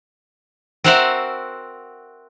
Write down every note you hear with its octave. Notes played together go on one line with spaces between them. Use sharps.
C4 F#4 A#4 C5 E5 F#5